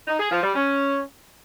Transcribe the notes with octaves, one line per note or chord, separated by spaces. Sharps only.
D#4
G#4
F3
G3
C#4